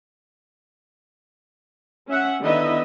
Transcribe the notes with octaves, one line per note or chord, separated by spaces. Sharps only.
C#4 E5 F#5
D3 D#3 B3 E4 D#5 E5